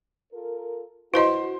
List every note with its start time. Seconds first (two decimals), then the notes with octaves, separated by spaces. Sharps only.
0.33 F4 A4 A#4
1.14 E4 F#4 B4 C5 D#5 C6